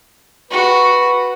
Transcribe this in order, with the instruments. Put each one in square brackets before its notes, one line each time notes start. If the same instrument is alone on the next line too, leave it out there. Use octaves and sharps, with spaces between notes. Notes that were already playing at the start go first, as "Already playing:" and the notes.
[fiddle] F#4 [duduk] B4